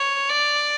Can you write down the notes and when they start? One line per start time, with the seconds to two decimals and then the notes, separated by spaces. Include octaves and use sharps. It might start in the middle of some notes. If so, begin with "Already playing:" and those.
Already playing: C#5
0.29 D5